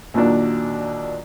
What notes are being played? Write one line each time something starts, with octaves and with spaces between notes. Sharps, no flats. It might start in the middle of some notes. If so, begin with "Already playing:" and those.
D#2 A#2 F#3 D4